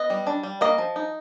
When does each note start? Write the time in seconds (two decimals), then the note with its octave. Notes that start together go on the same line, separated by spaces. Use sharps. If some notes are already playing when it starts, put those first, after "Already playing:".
Already playing: B3 D#5
0.10 G3
0.27 D4
0.43 G3
0.61 A#3 D#5
0.78 F3
0.96 D#4